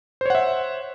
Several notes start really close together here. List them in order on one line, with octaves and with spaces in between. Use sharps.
C5 C#5 F#5 E5